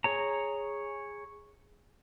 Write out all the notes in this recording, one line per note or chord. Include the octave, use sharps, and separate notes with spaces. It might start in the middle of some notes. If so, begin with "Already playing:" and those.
G#4 C#5 A#5